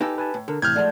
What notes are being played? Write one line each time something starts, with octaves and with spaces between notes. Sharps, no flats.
D#4 G4 A4 B4 G#5
B4 G#5 A5
A2
D3 A4 A#4
A2 C3 E3 F6 G6 G#6
G#2 F3 A3 D5 F#5 A5